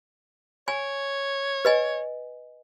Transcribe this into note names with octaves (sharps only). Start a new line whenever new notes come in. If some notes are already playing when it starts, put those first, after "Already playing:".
C#5 G#5
B4 D#5 G#5